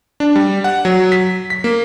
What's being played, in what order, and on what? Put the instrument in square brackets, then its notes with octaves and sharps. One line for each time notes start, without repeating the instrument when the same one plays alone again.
[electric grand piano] D4
G3
F#5
F#3
B6
B6
A#3